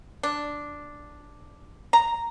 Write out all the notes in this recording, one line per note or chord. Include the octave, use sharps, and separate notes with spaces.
D4
A#5